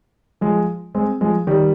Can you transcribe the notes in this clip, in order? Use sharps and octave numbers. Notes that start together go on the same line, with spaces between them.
F3 G#3
G#3 C4
F3 G#3
D#3 G3